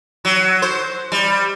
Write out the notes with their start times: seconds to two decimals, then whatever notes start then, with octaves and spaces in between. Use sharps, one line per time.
0.25 F#3
0.62 C5
1.12 G3